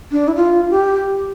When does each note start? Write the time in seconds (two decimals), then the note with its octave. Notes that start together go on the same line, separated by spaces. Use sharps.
0.12 D4
0.28 E4
0.36 F4
0.70 G4